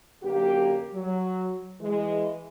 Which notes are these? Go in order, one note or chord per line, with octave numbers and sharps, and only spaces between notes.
F#2 D3 A#3 G4
F#3
E3 G#3